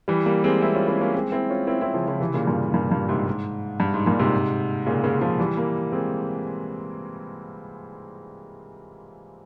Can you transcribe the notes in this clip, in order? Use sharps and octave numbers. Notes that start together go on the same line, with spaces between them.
E3 G3
G3 A#3
G#3 C4
C4 E4
C#4 F4
C4 E4
A#3 C#4
G#3 C4
C4 E4
C#4 F4
C4 E4
C4 E4
C#3 F3
C#3 F3
C3 E3
A#2 C#3
G2 A#2
G2 A#2
G2 A#2
G#2 C3
G#2
G2
G#2
G2 A#2
G#2 C3
A#2 C#3
A#2 C#3
C#3 F3
E3 G3
G3 A#3
G#3 C4